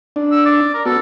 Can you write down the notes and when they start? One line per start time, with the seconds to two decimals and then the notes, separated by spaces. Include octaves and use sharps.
0.16 D4
0.31 E6
0.46 D5
0.74 A#4
0.85 B3 F#4 A4